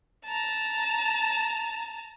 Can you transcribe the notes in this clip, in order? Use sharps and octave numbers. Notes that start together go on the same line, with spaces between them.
A5 A#5